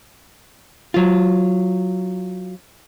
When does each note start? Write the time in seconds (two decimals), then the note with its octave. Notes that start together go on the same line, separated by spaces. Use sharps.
0.94 F#3 F4